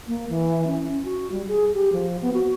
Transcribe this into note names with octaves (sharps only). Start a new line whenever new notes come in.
A#3
E3
C#4
C#4
F#4
G3
G#4
G4
F3
B3
F#4